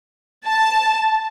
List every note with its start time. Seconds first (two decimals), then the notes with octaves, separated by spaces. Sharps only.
0.46 A5